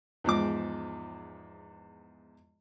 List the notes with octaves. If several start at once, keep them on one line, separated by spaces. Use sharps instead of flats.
E2 G#2 F3 D6